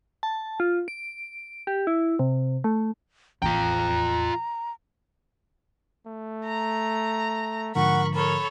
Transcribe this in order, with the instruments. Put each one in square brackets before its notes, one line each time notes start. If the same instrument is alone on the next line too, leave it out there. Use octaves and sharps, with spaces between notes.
[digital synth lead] A5
F4
D7
G4
E4
C3
A3
[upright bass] A1 E2 [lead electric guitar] F4 G5 [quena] A#5
[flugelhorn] A3
[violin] A#5
[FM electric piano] G#2 D3 F3 [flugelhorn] A#4 [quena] F#5 [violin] B5 C#6
[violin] A4 C#5 [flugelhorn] A#4 [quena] B5